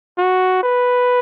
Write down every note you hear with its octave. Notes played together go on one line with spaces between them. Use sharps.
F#4
B4